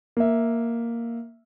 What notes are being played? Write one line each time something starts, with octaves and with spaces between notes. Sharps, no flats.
A#3 E5